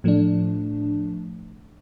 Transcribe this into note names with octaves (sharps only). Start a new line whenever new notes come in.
A2 F3 A3 D4